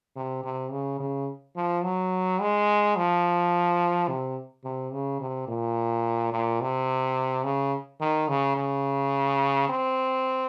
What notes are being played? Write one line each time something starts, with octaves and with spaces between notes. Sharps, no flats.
C3
C3
C#3
C#3
F3
F#3
G#3
F3
C3
C3
C#3
C3
A#2
A#2
C3
C#3
D#3
C#3
C#3
C4